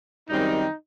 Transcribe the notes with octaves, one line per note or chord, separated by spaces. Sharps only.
F#2 D#3 G3 C4 D#4